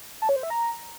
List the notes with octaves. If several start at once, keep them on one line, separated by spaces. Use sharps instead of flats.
A5
C#5
C5
E5
A#5